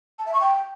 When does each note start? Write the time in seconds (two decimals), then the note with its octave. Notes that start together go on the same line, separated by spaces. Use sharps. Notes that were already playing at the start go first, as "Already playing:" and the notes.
0.19 A5
0.26 E5
0.33 C#6
0.41 G5